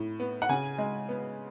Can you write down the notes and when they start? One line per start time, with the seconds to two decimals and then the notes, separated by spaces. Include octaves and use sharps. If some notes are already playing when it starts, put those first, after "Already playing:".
Already playing: A2
0.20 B3
0.42 F#5
0.49 C#3 G#5
0.78 G#3
1.09 B3